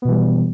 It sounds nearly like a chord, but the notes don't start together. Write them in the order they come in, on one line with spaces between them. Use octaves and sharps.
B3 B2 E3 G3